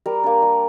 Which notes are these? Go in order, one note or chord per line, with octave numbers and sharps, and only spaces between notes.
G3 A#4
A#3 D4
G3